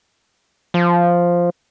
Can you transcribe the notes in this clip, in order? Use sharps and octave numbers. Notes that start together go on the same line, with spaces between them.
F3